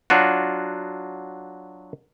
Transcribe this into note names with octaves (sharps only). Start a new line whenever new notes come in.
F#3 D4 F4 F#4